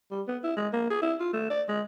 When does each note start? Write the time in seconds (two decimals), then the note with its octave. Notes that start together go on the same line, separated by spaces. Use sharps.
0.11 G3
0.28 B3
0.43 E4
0.57 G#3
0.73 A#3
0.90 G#4
1.02 E4
1.20 F4
1.33 A3
1.50 D5
1.68 G#3